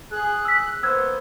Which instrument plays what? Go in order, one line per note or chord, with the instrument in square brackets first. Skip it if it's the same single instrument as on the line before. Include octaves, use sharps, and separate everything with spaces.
[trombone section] G#4 [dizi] F#6
[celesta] E6 B6
[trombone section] A#3 B3 C5 [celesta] E6 F#6 G#6